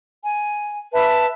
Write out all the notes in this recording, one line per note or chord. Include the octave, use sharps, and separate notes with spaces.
G#5
B4 E5 A5